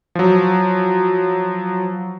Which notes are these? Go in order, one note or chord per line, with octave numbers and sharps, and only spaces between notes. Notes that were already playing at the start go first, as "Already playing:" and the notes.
F3 F#3